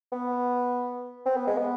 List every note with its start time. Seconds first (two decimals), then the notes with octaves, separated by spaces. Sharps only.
0.12 B3
1.26 C4
1.36 B3
1.47 G#3
1.57 B3